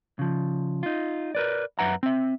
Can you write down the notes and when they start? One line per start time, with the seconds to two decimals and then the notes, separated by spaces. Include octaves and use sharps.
0.19 C#3 F3
0.83 D#4 F4
1.35 A#4 B4 D5
1.79 F#2 B4 E5 F#5 A#5
2.03 C4 E5